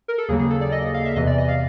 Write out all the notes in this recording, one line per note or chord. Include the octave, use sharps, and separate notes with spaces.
A#4
A4
D#2 C#3 F#3 A#3 G#4
G#4
A4
D5
D#5
F5
E5
E2 C3 E3 D#5
D5
D#5
F5